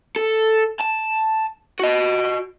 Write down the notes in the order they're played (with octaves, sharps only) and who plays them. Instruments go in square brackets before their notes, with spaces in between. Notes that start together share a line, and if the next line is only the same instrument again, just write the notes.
[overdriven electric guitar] A4
A5
F#4 D#5